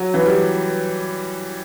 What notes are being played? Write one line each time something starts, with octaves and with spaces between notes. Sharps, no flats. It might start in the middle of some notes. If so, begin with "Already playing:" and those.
Already playing: F#3
E3
G3